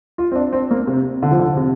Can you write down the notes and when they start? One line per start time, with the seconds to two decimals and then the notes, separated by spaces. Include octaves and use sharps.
0.18 F4
0.32 C4
0.35 D4
0.53 C4
0.71 A#3
0.87 C3
1.23 D3
1.31 F3
1.39 D3
1.57 C3